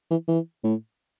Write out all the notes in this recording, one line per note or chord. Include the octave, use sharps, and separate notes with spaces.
E3
E3
A2